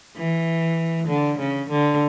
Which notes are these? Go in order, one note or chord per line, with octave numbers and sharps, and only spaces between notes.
E3
D3
C#3
D3